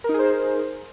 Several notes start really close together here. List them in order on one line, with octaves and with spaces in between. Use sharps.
A#4 D#4 G#4 C5